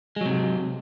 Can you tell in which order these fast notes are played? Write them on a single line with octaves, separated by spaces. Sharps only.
G#3 F#3 C3